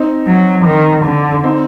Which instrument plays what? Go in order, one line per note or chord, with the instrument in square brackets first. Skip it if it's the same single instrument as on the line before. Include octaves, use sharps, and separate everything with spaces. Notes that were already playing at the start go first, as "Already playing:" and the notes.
Already playing: [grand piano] C4 D#4
[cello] F#3
D#3
D3
[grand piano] C4 D#4